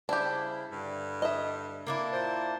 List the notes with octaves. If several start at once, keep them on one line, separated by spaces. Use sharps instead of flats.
C#3 G3 D4 E4 G4 C5
G2 D3 G3
D#5 E5
A#3 D4 E4
A#2 C5